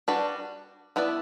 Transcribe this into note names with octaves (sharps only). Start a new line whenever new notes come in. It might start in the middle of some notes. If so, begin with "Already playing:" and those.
G3 D4 F#4 B4 D5
B3 E4 B4 D5